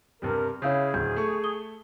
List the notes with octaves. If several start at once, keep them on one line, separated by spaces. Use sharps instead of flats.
G2 C3 G3 A#4
C#3 E4 G#4 C#5 F5 G6
D1 G6
A3 C#6
D#6 G7